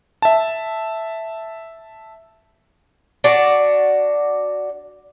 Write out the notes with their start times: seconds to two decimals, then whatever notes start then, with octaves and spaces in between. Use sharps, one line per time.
0.22 E5 A5
3.24 D4 F#4 D5